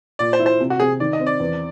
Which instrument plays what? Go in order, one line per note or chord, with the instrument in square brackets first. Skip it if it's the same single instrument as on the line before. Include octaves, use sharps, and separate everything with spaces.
[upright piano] A#2 [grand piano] D5
[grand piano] C5
[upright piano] E4
[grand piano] C5
[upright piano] C3
[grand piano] F#4
[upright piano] C3 [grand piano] G#4
[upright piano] D#3 [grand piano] D5
[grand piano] D#5
[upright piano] C4
[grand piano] D5
[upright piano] E2